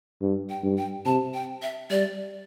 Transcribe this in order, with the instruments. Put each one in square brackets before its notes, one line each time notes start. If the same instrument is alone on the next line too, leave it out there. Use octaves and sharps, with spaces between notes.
[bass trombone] G2
[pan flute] G5
[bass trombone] G2
[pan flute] G5
[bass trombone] C3 [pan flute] A5
[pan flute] G5
E5
[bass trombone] G3 [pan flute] D5